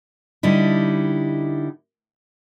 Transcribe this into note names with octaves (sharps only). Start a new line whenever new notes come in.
D3 G3 D#4 E4